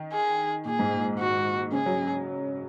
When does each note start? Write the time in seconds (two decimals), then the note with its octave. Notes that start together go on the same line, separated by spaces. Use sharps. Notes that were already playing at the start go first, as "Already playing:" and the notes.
Already playing: D#3
0.13 G#4
0.65 A#2 G#4
0.79 G#2
0.94 A#2
1.19 F#4
1.72 C#3 G#4
1.86 F#3